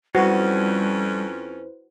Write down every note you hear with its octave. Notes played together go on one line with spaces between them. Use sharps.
F2 G3 C#4 E4 F#4 B4 C5